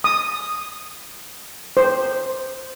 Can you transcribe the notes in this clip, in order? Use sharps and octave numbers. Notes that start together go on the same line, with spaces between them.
D#6
C5